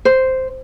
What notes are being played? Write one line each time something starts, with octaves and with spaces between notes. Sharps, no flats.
C5